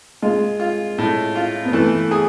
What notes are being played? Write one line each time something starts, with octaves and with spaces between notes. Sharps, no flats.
G#3 F4
F4
A2
F4
B3
E3 A3
G#4